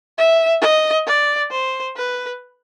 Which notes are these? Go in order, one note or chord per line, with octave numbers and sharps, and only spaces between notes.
E5
D#5
D5
C5
B4